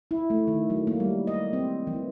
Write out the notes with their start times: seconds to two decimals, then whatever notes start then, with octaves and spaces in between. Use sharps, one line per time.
0.11 E4
0.30 A3
0.47 D#3
0.70 F#3
0.87 A#3
1.00 G3
1.27 D#5
1.53 C4
1.87 E3